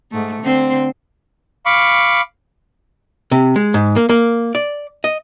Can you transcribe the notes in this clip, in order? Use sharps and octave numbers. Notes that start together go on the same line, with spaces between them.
G#2 A3
D3 C4 C5
F5 B5 C#6 D6
C3
G#3
G#2
A#3
A#3
D5
D#5